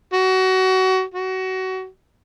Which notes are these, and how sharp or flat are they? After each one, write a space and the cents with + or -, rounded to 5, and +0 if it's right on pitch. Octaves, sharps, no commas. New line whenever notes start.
F#4 +25
F#4 +25